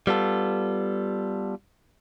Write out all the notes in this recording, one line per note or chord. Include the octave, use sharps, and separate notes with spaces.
G3 B3 F4 A4